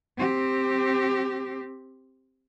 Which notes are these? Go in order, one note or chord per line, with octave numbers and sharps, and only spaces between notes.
C4 G4